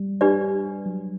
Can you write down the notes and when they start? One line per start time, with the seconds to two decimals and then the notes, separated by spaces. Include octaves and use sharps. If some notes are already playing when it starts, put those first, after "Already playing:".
Already playing: G3
0.21 D4 G4 B4 D5
0.86 F#3